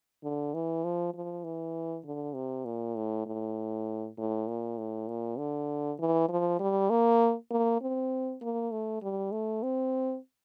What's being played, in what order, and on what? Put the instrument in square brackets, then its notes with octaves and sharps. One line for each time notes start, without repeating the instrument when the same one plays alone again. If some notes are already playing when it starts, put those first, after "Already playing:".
[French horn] D3
E3
F3
F3
E3
D3
C3
A#2
A2
A2
A2
A#2
A2
A#2
D3
E3
F3
G3
A#3
A#3
C4
A#3
A3
G3
A3
C4